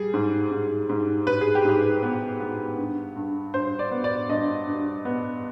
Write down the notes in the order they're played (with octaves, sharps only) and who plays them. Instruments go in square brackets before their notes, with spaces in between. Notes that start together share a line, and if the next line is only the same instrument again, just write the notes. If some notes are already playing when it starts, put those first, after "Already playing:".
Already playing: [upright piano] G3 G#4
G#2
G#2
G#2
G#2 B4
G#4
G4
G#2 G#4
B3
B3
G2
G2
G2 C5
D5
B3
D5
G2 D#5
G2
B3